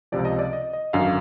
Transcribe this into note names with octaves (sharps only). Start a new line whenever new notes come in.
C#2 C3 F3 D5
D#5
D5
D#5
D#5
G#1 F#2 D3 F5